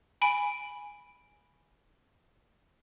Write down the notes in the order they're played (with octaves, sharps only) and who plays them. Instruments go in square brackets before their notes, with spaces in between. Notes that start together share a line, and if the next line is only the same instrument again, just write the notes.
[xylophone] G#5 B5 D7